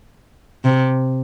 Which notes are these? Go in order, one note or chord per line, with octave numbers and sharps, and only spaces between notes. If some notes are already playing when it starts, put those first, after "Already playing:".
C3